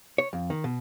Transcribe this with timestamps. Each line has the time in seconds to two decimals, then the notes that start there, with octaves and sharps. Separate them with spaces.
0.18 C#5
0.33 F2
0.50 D#3
0.64 B2